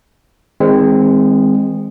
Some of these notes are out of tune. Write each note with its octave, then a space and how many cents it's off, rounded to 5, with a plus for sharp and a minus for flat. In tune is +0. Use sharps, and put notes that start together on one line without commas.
D#3 +30 G#3 -20 C4 +0